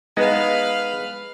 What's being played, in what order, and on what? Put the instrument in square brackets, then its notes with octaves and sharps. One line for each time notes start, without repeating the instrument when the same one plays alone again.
[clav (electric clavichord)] G#3 B3 D#4 [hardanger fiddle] B4 F5